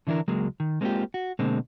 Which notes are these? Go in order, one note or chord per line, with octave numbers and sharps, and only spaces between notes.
D3 E3 D4 E4 A#4
C#2 F#3 G#3 A#3
D#3
G#3 A#3 C4 E4 F4 G4
F#4
B2 D3 G#3 A#3 C4